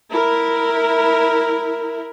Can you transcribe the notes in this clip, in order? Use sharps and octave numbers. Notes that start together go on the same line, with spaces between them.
E4 A#4